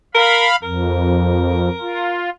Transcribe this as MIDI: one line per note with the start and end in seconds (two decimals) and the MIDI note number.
0.15 0.46 70
0.15 0.56 77
0.15 0.56 83
0.63 1.69 41
0.63 2.24 70
1.81 2.30 65